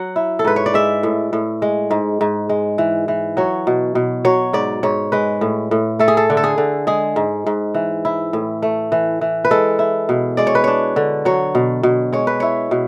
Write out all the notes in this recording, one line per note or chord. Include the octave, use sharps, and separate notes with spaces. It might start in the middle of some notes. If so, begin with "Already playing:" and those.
Already playing: F#3 F#5
E4
A4
G#2 B4
C#5
D5
G#3 E5
A2
A2
G#3
G#2
G#2
G#3
E3
E3
F#3 C#5
B2
B2
F#3 C#5
G#2 D5
G#2 C#5
G#3 B4
A2
A2
A3 A4
G#4
A4
D3
A4
G#4
D3
G#3 G#4
G#2
G#2
E3
E4
A2
A3
E3
E3
B4
G#3 A4
E4
B2
G#3 D5
C#5
B4
D4 C#5
D3
F#3 C#5
B2
B2
G#3 C#5
B4
E4 C#5
B2